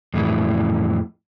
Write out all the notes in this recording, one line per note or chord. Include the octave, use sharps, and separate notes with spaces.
F2 A2 E3